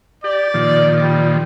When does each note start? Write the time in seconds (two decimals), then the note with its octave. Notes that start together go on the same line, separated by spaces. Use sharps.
0.24 G4 D5
0.54 A#2 D#3 F3
1.02 G3